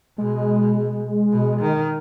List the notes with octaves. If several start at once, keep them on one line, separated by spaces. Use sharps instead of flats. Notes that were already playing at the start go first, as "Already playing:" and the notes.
B2 G#3
B2
D#3